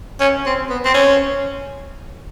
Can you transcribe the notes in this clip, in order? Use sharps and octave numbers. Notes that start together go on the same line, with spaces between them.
C#4
C4
B3
C4
C#4